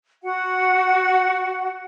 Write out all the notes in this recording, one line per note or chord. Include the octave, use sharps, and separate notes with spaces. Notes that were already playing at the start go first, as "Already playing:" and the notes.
F#4 F#5